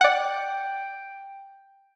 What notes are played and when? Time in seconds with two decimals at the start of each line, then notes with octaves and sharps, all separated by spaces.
0.01 D5 F#5 G5